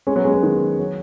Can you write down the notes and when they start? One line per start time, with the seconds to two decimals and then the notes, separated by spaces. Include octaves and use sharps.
0.07 G#3 C#4
0.16 F#3 B3
0.25 G#3 C#4
0.34 F#3 B3
0.43 D#3 G#3
0.79 F#3